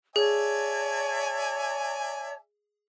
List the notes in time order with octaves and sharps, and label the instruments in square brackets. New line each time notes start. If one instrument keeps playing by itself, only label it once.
[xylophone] G#4 [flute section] C#5 A5 [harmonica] D5 E5 G#5